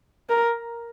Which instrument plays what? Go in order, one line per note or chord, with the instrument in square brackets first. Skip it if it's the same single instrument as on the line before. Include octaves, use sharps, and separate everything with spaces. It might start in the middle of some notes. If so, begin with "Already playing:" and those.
[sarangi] A#4